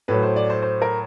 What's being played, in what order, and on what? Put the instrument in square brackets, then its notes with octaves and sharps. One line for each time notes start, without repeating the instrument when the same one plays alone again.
[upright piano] A2 F#3 B4
C5
D5
C5
C5
A#4